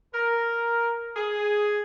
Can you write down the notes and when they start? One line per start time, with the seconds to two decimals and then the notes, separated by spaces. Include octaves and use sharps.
0.15 A#4
1.17 G#4